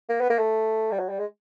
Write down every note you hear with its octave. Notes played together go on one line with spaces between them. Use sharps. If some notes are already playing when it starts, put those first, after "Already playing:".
A#3
B3
A#3
A3
G3
F#3
G3
G#3